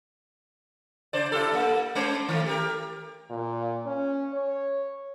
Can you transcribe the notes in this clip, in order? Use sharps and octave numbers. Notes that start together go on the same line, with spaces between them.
C#3 C5 D5
E4 G4 A4
G3 A#3
G#3 C#4 C5
D#3 A3
G4 A#4
A#2
C#4
C#5